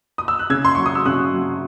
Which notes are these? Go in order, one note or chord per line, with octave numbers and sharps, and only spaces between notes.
D#6
E6
F#6
C#3 E6 G#6
C6
F#3 C#6
D#6
E6
C#3 D#6 F#6
F#3